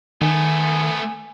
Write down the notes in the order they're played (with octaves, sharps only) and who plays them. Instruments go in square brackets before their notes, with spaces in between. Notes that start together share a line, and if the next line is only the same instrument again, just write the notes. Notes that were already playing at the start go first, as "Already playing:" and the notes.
[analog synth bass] D#3 [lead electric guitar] A3 B3 [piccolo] G#5